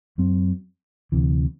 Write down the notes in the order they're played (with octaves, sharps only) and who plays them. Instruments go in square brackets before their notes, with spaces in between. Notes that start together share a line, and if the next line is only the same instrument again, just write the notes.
[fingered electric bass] F#2 F#3 C4
D2 C3 E3